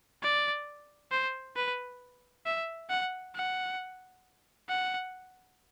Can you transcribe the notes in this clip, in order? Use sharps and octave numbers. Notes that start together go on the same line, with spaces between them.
D5
C5
B4
E5
F#5
F#5
F#5